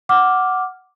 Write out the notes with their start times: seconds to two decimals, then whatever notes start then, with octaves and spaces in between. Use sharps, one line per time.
0.09 F#5 D6 F6